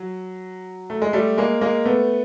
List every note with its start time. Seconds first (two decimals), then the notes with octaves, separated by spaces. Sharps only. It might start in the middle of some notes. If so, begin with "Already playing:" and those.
Already playing: F#3
0.90 A3
1.02 G#3
1.13 G3 A3
1.38 G#3 A#3
1.61 G#3 A#3
1.85 A3 B3